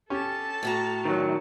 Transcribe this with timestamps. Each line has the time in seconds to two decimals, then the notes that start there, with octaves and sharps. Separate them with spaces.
0.10 C#4 G4 A4 A5
0.63 A2 F#4 A#5
1.05 D#3 F#3